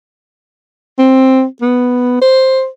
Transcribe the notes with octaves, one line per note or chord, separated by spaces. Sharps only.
C4
B3
C5